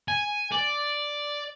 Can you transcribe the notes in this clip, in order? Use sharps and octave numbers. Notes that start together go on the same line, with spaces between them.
G#5
D5